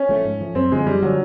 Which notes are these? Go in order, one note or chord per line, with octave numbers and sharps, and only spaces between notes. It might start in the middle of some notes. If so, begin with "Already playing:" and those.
Already playing: C#4
F3 A3
G#2
F3 A3
F#2 C4
D3 F3 G#3
F#2 G3
D3 F3 F#3